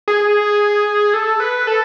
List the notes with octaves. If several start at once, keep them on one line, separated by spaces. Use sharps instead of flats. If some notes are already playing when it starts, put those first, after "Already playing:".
G#4
A4
B4
A4